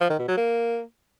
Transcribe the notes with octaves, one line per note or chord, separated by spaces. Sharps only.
F3
D#3
B2
F#3
A#3